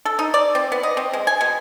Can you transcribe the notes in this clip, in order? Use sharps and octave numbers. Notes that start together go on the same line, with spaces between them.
A4
D#4
D5
C4
B3
D#5
C4
G#3
G#5
B2